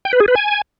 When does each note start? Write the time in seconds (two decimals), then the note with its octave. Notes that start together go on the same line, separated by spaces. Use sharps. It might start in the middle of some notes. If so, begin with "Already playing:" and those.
0.05 G5
0.13 B4
0.20 G#4
0.28 B4
0.36 G#5